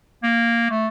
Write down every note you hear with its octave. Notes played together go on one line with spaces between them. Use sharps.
A#3
A3